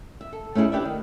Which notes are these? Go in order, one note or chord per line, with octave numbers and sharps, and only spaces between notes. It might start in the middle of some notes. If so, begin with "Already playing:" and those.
E5
A4
A3 C#4 D#4 E4 G#4
D4 G4 B4 D5 E5
D#3